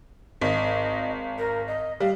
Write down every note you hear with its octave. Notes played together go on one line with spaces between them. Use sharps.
G#1 D#5
A#4
D#5
G3 F5